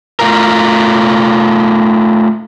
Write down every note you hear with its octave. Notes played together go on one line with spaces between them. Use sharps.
A3 F4 A#4